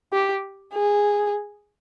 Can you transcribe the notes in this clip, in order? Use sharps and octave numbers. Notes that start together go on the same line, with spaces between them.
G4
G#4